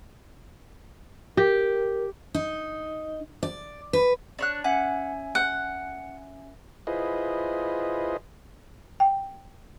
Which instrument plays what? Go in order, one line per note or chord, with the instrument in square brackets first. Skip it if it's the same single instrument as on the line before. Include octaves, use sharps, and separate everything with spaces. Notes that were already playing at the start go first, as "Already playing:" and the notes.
[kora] G4 [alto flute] A#4
[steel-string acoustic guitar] D#4
D5
B4
[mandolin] D4 C#5 F#6
[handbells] C#4 E5 G#5 [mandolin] F#5
[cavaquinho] F#5 [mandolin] G6
[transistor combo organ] E4 F4 G#4 B4 C5 D#5
[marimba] G5